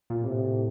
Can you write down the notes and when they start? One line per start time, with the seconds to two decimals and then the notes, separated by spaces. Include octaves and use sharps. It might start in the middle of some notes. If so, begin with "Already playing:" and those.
0.10 A#2
0.23 A2 C3